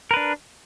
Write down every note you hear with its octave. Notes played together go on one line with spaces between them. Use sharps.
D4 A#4 B4